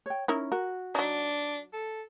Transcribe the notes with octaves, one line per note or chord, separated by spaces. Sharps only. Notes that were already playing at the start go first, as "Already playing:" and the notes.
C#5 G5
C#4 D#4 E4 A#4
F#4 A#4
F#3 D4 D#4
A4